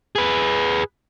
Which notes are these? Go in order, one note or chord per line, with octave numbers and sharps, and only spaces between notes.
G#4 B4